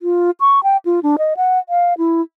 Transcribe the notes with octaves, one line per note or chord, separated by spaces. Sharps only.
F4
C#6
G5
F4
D4
D#5
F#5
F5
E4